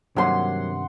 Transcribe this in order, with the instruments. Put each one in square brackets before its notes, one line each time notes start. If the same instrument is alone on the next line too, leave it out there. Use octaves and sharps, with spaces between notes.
[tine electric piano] G2 C3 D#3 [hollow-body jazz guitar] F#3 A#3 C#4 [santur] F#5 C6